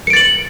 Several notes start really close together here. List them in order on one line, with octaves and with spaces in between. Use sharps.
C#7 D7 A6 F#7